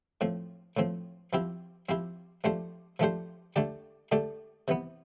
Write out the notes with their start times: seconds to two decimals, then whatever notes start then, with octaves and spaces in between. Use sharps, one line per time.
0.21 A2 F3 C4
0.77 A2 F3 C4
1.33 F3 C4 E4 G4
1.89 F3 C4 E4 G4
2.44 F3 A3 D4 G4 C5
2.99 F3 A3 D4 G4 C5
3.56 D3 A3 D4 G4 D5
4.12 D3 A3 D4 G4 D5
4.68 C3 E3 B3